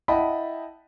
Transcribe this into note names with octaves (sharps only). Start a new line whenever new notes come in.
E4 D#5 F#5 G5 A5 B5